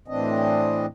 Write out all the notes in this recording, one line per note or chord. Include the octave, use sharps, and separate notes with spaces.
A2 E3 C4 D4 D#5